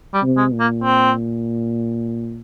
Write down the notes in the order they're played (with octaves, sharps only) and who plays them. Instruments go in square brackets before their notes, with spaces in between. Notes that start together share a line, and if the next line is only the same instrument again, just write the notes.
[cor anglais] G3
[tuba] C3
[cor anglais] G#3
[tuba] A#2
[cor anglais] A#3
C4